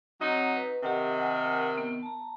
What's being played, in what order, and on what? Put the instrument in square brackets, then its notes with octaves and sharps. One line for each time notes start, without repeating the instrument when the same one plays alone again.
[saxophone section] F#3 D#4 [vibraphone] C4 C#5 F#5
[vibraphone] B4
[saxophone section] C3 D#3 [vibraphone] G4 F#5 G5
[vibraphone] F#5 G#5
B3
A5 A#5